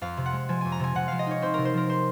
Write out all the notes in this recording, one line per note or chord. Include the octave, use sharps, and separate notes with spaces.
F2 F5
C3
F#5
G#3
F3 G#5
F2 G#5
A#5
C3 G#5
C3 F#5
F3 F5
D#5
D#4 C#5
C4 C5
C3 A#4
C5
F3 A#4
C5